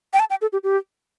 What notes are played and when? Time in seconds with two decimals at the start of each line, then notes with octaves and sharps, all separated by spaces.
0.13 G5
0.20 A5
0.30 G5
0.42 A4
0.53 G4
0.64 G4